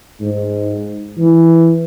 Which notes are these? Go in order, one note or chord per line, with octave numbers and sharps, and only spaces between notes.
G#2
E3